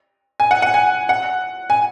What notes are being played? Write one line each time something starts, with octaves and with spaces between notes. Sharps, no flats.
G#5
F#5
F#5
G#5
F#5
G#5